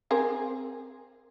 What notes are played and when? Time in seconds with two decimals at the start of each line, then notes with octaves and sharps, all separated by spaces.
0.11 C4 G#4 A#4